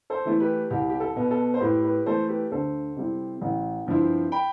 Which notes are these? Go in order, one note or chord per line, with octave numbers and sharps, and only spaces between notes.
A4 C5
E3 A3 E4
G4 B4
C2 G4
G4
A4
B2 B3
A4
C5
A2 G4 B4
G4 B4
E3 A3 A4 C5
G4 B4
D2 A4 C5
C3 G3 C4 E4
A1
G2 F3 C4 E4
G5 B5